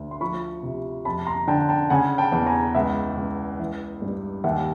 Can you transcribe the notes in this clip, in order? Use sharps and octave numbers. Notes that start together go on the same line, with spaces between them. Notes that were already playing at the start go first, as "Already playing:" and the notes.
Already playing: D2
C6
F3 B5 C#6
C3
F2 A5 B5
A#5 C6
D3 G5 A5
G5 A5
C#3 F#5 G#5
G5 A5
E2
G#5 A#5
C#2 E5 F#5
C#2
E3
G2
D#2 E5 F#5